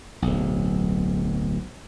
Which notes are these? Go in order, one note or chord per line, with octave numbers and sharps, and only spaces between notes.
D1 B1